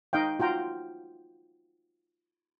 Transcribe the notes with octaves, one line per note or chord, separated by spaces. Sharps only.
D#4 D#5 F5 G5
F4 F#4 G5 A#5